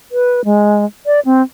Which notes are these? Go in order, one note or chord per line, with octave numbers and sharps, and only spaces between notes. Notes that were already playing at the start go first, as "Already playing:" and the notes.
B4
G#3
D5
C4